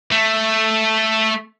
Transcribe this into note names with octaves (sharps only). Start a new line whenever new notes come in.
A3